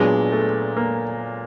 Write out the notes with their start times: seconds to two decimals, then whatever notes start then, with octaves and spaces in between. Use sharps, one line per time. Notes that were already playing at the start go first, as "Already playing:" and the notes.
Already playing: A#2 F#3 G#3 B3 D4
0.32 A3
0.77 A#3